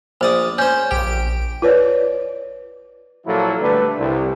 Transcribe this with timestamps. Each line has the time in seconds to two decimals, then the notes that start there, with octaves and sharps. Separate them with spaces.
0.21 A#1 C5 D5 D#6
0.58 C#4 C5 G6
0.91 A#1 G4 D7
1.62 F4 B4 C#5 D5
3.26 A#2 F3 F#3 A#3 E4 A4
3.61 D3 G3 A3 D4 B4
3.99 C2